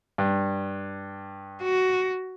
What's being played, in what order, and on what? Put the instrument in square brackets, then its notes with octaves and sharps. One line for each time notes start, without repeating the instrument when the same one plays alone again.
[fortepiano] G2
[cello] F#4